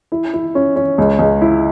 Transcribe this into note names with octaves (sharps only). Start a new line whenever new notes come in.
E4
E4
C#4
C#4
C#2
C#2
E4